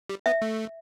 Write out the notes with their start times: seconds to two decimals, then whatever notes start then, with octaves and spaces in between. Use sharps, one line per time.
0.09 G3
0.26 B3 E5
0.42 A3